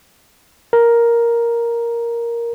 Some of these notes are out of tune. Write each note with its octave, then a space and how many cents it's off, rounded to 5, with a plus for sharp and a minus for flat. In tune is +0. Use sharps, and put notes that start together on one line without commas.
A#4 +5